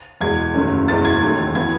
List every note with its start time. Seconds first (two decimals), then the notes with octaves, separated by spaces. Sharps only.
0.21 E2 B2 G#3 G#6
0.54 F#1 F#2 D#3 A3 C#4
0.88 F#1 E2 B2 G#3 A6
1.05 G#6
1.23 D#2 D#3 F#3 A3
1.55 E3 B3 G#6